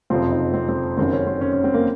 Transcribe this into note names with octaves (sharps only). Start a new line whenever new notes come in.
F#1 F2 C3 F3 C4
D#4
C4
C4
F#1 F#2 D#3 F#3 C4
C#4
C4
C#4
C#4
C4
A#3